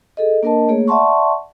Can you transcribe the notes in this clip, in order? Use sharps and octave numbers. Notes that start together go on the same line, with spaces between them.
G#4 A4 D#5
A#3 D4 A#4 D#5 A5
A3 A#3 G#4 C#5
D5 E5 F#5 A5 C6 C#6